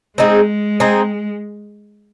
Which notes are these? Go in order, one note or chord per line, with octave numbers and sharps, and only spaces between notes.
G#3 C4 D#4 G#4
C4 D#4 G#4